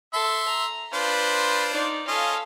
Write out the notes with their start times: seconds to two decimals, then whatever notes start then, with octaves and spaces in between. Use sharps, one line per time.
0.14 A4 E5 C6
0.48 A#5
0.93 D4 F4 B4 C5
1.72 D#4 D5
2.08 C#4 F4 A4 D#5 F5